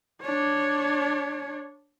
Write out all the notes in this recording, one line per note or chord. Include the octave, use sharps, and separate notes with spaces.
D4 C#5